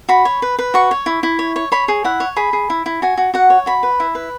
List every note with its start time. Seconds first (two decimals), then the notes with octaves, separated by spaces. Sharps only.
0.09 F#4 B5
0.25 C#5
0.42 B4
0.59 B4
0.74 F#4 C#6
0.91 C#5
1.06 E4
1.23 E4
1.39 C#5
1.56 C#5
1.72 C#5 B5
1.88 G#4
2.04 E4 F#5
2.20 C#5
2.36 G#4 B5
2.53 G#4
2.70 E4
2.86 E4
3.02 F#4 G#5
3.17 F#4
3.34 F#4 F#5
3.50 C#5
3.66 F#4 B5
3.83 B4
4.00 E4
4.15 B4